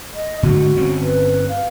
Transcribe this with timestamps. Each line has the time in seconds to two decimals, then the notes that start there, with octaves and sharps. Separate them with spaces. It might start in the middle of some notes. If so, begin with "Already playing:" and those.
0.14 D#5
0.43 G#2 D3 A3 F#4
0.77 G1 C4 C#4
1.01 B4
1.49 F5